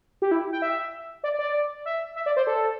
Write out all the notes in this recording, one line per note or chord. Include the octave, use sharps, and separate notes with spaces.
G4
E4
G5
E5
D5
D5
E5
E5
D5
C5
A4